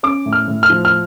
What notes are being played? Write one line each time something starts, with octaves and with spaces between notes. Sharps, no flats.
C#4 D6
A2
F6
A2
F6
F3
F6